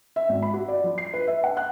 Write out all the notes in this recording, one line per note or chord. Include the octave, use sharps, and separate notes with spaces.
E5
G#1
B5
F#4
D5
F3
C7
B4
E5
F#5
F#6